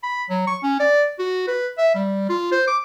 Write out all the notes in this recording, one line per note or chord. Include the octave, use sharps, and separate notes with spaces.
B5
F#3
C#6
C#4
D5
F#4
B4
E5
G3
F4
C5
D6